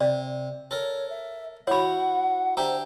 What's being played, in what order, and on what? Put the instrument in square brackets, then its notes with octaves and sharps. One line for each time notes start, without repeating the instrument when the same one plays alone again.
[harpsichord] C3 [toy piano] D5
[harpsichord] A4 A#4 [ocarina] C#5
[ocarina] E5
[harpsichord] E4 F#4 [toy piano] C#5 B5 [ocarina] F#5
[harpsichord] D4 G4 E5 [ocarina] C5 [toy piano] A#5